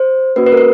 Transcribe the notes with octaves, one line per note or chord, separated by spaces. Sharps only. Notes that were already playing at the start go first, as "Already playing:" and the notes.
Already playing: C5
A#3 C#4 F#4 B4
B4
A#4
B4